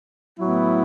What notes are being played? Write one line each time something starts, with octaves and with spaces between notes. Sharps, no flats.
A2 F#3 B3 E4